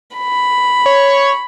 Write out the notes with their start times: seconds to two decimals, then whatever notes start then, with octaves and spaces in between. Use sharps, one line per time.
0.17 B5
0.86 C#5